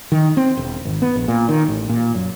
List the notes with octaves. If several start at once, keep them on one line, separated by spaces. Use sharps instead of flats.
D#3
C4
E1
G#1
B3
A#1
A#2
D#3
A1
A#2
F#2